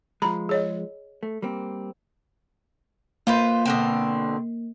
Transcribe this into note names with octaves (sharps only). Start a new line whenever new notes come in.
F3 G#3 A#5 B5
G#4 C#5 D#5
A3
G3 A#3 C4
A#3 F4 B4 C5
B2 D3 C4